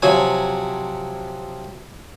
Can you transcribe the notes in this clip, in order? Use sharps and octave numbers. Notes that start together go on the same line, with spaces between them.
C3 F3 F#3 C#5 G#5